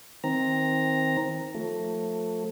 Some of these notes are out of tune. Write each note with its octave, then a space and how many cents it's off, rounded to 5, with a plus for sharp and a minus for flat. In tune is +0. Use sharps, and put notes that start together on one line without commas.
D#3 +30 C4 +10 A#5 +0
F3 +30 A3 +15